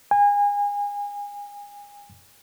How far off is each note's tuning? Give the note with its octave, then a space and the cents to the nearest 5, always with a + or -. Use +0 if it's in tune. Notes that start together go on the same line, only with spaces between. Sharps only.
G#5 -30